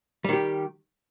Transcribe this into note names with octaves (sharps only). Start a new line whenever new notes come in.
D#3 G3 G4